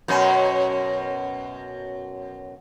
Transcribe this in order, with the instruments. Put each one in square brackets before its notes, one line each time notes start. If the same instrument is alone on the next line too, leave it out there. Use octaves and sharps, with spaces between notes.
[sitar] F#2 B2 C#4